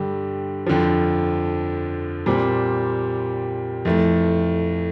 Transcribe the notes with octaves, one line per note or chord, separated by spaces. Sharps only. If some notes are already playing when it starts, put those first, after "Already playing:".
Already playing: G2 D3 G3
F2 D3 F3
A#2 G3 C4
F2 E3 A3